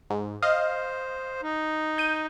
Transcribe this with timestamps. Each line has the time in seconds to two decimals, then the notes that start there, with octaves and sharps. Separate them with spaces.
0.10 G#2
0.42 C5 D#5 F5
1.43 D#4
1.98 G6 D#7